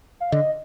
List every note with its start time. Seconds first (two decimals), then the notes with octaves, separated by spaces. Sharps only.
0.20 F5
0.32 D3 D#5